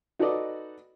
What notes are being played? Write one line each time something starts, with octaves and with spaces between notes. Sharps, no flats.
D#4 F#4 A4 B4 D5 D#5